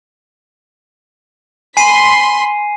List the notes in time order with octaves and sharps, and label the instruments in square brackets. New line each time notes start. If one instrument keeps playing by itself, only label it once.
[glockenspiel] G#5 C7 D#7 [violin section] B5 C6 B6